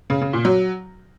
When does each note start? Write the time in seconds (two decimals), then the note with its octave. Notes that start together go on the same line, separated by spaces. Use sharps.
0.10 C#3
0.22 C#3
0.33 A#2
0.45 F#3